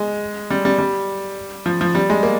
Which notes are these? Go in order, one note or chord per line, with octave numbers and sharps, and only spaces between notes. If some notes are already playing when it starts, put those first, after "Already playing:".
Already playing: G#3
G3
G3
G3
F3
F3
G3
G#3
A#3